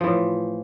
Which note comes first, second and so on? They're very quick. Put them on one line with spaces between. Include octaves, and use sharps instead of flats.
F3 E3 A2